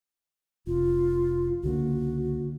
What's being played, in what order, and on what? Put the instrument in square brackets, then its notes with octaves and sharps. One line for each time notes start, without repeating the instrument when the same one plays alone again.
[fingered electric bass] F1 [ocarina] F4
[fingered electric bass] C#2 D3 A#3 [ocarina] F#4